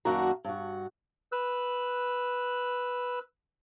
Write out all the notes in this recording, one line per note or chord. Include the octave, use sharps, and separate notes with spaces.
F#2 D#3 A#3 D4 F#4 A#5
G2 F#4
B4 E6 F#6